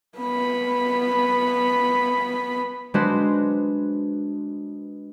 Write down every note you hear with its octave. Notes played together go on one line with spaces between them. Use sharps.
B3 B5
G#3 D4 F#4 B4 C5